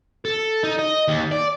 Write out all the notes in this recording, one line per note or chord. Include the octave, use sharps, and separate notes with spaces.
A4
D#4
D#5
D#2
D5